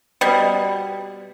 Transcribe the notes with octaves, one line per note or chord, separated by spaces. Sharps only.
B2 G3